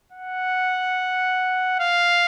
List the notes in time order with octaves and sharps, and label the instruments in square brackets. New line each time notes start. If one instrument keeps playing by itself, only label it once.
[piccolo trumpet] F#5
F5